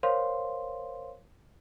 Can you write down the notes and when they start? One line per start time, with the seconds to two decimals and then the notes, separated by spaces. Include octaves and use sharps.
0.03 A#4 C5 C#5 F5 C6